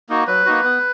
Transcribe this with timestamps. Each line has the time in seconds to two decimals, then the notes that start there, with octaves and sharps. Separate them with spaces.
0.09 A#3 D#4 F#4
0.27 F#3 B4
0.46 A#3 D#4 F#4
0.64 B3